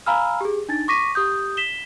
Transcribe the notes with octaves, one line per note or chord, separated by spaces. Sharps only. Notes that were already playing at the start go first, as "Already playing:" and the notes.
F5 G#5 A#5 B5 E6 F6
G4 G#4
D4 D#4 A6
C#6 D6 A#6 B6 D#7
G4 D#6 G6
B6 E7 G7